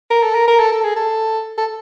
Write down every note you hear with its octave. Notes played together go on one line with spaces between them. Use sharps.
A#4
A4
A#4
A#4
A4
A4
G#4
A4
A4